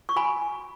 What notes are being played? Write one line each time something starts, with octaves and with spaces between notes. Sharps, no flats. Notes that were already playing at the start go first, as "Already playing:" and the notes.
C#6
F#4 G#5 B5